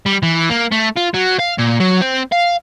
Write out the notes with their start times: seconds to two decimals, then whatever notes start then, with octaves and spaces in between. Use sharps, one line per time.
0.06 G3
0.23 E3
0.50 A#3
0.72 A3
0.97 F4
1.14 F#3
1.39 F5
1.58 A#2
1.80 F#3
2.02 C4
2.32 F5